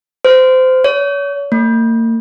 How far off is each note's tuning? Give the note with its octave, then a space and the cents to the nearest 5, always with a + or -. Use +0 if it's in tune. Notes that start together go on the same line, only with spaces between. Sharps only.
C5 -25
C#5 +35
A#3 -40